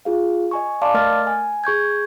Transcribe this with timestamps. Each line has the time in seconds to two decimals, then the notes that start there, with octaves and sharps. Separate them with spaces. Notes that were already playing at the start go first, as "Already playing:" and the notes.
0.05 F4 G#4 F5
0.51 D#5 G#5 C#6
0.82 D5 F5 A5 C6 D6
0.94 A3 A#4 D#5 F6 A6
1.27 G#5
1.64 G#4 C#6 G6 G#6